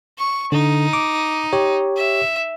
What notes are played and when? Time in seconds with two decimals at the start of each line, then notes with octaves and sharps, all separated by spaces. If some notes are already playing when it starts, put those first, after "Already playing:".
0.18 C#6
0.52 D3 D#4
0.93 D6
1.53 G4 C#5
1.96 E5